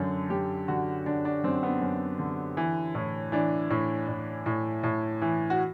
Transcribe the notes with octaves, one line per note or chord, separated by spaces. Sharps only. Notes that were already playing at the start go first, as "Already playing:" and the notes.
Already playing: F#2 D3
F#2 G4
D3 F#4
D3 D4
D4
F#2 C4
B3
F#2
D3
E3
A2
E3 D4
A2
A2
A2
A2
E3
F#4